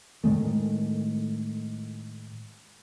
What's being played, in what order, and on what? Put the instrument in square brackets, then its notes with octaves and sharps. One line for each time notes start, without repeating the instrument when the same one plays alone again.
[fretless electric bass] A2 D#3 G#3 A3